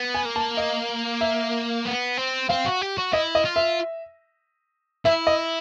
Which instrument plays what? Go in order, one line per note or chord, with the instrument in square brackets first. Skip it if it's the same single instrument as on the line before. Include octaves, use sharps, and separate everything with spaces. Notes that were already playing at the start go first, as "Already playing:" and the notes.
Already playing: [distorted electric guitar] B3
[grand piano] G#5
[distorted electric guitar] A#3
[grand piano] A5
D#5
E5
[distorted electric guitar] B3
C4
[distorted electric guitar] C4 [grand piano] F5
[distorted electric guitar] F#4
G4
F#4
[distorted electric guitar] E4 [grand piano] D#5
[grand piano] D#5
[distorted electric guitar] F4
[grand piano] E5
[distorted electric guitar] E4 [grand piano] E5
[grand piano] D#5